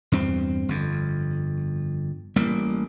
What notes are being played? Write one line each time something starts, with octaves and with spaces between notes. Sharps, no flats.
E2 G2 C4
G1 F2
A1 G3 A#3